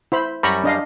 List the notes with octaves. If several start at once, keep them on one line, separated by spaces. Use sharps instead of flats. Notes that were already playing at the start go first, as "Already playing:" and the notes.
E4 C5 B5
F#2 G3 A#5 B5 C#6
D4 D#5 F5